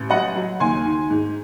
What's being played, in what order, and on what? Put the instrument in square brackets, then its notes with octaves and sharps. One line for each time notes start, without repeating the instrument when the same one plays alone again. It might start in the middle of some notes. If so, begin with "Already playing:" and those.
Already playing: [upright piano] A1
F#3 D#5 F#5
F#3
D#2 G#5 C6
D#3
G#2